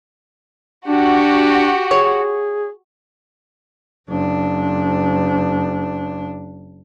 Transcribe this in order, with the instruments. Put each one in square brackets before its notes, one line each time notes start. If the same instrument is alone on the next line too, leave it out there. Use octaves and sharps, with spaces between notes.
[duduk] D4 [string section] F#4 [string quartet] G4
[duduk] G#4 [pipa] C#5
[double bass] F#1 D4